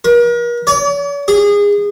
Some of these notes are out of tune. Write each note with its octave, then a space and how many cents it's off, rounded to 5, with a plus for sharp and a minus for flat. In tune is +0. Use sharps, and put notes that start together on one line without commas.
A#4 +40
C#5 +45
G#4 -25